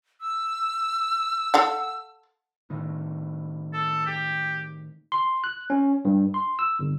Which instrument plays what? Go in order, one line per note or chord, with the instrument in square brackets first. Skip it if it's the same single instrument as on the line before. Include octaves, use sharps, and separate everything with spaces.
[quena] E6
[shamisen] A4 F5 F#5
[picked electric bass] A2 D#3
[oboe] A4
G4
[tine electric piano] C6
F#6
C#4
G2
C6
E6
G1